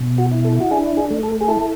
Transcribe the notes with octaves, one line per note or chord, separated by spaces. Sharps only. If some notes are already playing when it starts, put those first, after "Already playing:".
Already playing: B2
F#4
E4
A4
F#4
D4 G#4
G#4
A3
A4
G#4
E4 A4